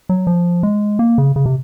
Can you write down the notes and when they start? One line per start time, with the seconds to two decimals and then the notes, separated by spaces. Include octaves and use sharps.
0.09 F#3
0.27 F3
0.63 G#3
0.99 A#3
1.18 C#3
1.36 C#3
1.46 C3